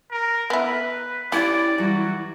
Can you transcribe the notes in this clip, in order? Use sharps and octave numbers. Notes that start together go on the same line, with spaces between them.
A#4
B3 E4 B4
C#4 E4 G4 D5
E3 F#3 G3 F#4